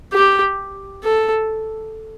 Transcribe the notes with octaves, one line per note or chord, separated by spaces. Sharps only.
G4
A4